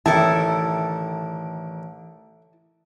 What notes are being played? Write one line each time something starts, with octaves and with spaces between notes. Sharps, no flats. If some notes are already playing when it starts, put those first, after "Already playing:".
A1 D3 D#3 E4 A4 E5 G5 A5